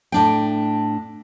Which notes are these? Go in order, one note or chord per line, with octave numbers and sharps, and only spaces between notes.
A2 D4 G5